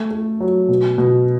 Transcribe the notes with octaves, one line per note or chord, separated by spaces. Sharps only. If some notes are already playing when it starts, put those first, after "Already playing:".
Already playing: A3
A3
F#3
B2
B2